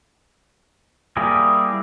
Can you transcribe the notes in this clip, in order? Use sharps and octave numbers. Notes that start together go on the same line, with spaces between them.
G3 A#3 E4 G4 G#4